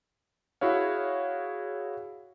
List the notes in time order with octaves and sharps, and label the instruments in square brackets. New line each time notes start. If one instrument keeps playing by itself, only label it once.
[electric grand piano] E4 F#4 G#4 C#5 F5